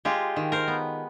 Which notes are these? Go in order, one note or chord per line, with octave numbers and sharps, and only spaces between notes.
G#3 F4 G4
D#3
A#4 C5
B3